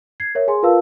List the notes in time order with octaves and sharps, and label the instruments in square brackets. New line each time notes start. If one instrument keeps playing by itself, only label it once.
[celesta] G#6 C7
A#4 C#5 E5
G#4 G#5 C6
F4 A#4 B4 F5 A5 E6